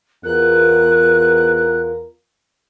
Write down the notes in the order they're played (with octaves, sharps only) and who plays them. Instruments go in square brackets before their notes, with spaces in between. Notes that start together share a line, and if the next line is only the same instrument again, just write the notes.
[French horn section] E2 F4 A#4 [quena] F#6